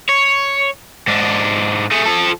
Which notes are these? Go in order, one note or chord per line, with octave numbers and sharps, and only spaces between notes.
C#5
G#2 D4
A3 G#4
F3 A4